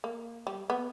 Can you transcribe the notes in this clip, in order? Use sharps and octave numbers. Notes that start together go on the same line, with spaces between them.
A#3
G3
B3